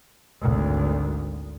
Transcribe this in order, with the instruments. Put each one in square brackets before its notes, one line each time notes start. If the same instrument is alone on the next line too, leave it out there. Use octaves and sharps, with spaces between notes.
[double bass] G#1 D2